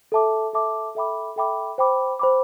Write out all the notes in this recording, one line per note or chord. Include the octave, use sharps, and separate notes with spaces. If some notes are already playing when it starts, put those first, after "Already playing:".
A4 E5 A5 D6
A4 E5 A5 D6
A4 E5 G5 B5 D6
A4 E5 G5 B5 D6
C5 G5 B5 D6
C5 G5 B5 D6